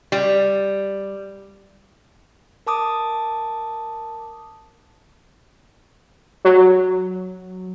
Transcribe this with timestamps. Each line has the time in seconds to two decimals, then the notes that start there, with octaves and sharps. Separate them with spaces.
0.12 G3
2.66 A#4 A5 D6 D#6
6.45 F#3